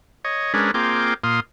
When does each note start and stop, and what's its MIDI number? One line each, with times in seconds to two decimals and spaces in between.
0.25 0.53 73
0.25 0.53 75
0.54 0.71 56
0.54 0.71 61
0.54 0.71 62
0.54 0.71 70
0.54 0.71 71
0.74 1.14 58
0.74 1.14 60
0.74 1.14 65
0.74 1.14 68
0.74 1.14 79
0.74 1.14 86
1.24 1.40 46
1.24 1.40 77
1.24 1.40 84
1.24 1.40 87